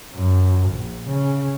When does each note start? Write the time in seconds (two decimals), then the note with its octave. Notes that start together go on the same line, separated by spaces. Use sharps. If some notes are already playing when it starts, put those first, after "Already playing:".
0.15 F#2
0.70 A#1
1.08 C#3